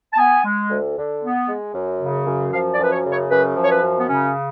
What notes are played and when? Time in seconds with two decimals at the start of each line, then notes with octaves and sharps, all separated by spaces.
0.13 A5
0.18 B3 G#5
0.45 G#3
0.70 D2
0.97 D3
1.22 B3
1.48 G#3
1.74 F#2
2.00 C#3
2.26 F#2
2.52 F3 F5
2.72 D5
2.79 F#2 B4
2.91 C#5
3.05 C#3
3.11 C#5
3.30 F#2 B4
3.56 F3
3.62 C#5
3.70 B4
3.83 F#2
3.99 B3
4.08 C#3 C#4